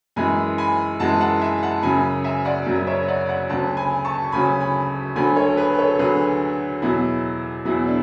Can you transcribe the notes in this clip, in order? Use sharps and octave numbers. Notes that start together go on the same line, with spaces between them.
F#2 E3 G#3 G#5 B5
G#5 B5
F#2 E3 G#3 F#5 A5
F#5 A5
E5 G#5
F#5 A5
F#2 C#3 F#3 G#5 B5
E5 G#5
D5 F#5
F#2 C#3 F#3
C#5 E5
D5 F#5
D5 F#5
D2 C#3 F#3 F#5 A5
G#5 B5
A5 C#6
D2 C#3 F#3 G#5 B5
G#5 B5
D2 D3 F#3 G#5 B5
A4 C#5
G#4 B4
A4 C#5
D2 D3 F#3 G#4 B4
E2 B2 F#3 E4 G#4
E2 B2 F#3 E4 G#4
D4